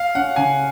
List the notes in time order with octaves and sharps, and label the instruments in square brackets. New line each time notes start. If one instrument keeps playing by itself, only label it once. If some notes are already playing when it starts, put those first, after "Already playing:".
Already playing: [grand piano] F5
[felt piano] C#4 [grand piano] F#5
[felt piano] C#3 [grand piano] G#5